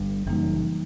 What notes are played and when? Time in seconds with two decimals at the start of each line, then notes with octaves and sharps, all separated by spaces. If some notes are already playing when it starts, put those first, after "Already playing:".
Already playing: G1 G2
0.26 F#1 F#2 E3 G3 A#3 D#4